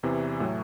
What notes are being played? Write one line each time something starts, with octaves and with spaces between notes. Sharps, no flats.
E2 C3 E3
A2 F#3 A3